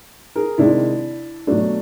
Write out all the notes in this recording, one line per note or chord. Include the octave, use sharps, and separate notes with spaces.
G#4 A#4
C3 D#3 G#3 D4 E4
B2 F#3 A3 D4